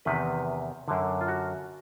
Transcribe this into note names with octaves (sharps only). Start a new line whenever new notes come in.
E2 C3 D#3 B4
F#2 D3
F4
F#4